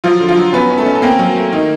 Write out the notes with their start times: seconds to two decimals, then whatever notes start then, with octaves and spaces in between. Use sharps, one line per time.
0.04 F3 F#3 F4
0.20 D3
0.28 F3 F4
0.37 F#3
0.53 B3 C#4 B4
0.70 C#4
0.78 A3 A4
0.86 C#4
0.95 A4
1.02 A#3 C4 A#4
1.19 F#3
1.36 A3
1.52 D#3